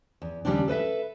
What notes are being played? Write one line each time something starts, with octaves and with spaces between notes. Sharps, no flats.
E2
D#2 C#3 G3 A3 C4 D4
A4 B4 D#5 E5